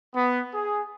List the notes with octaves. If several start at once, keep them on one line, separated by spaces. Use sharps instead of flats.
B3
G#4